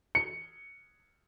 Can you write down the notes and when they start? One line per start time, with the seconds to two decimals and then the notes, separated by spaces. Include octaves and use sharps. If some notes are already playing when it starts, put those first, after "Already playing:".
0.15 C#7